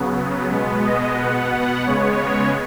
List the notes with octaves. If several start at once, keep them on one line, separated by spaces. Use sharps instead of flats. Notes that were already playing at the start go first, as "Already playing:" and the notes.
Already playing: C#3 F#3 B3
B2 G#3 B3
D#5
B2 B3 F#5
F#5
C#3 G#3 B3 C#5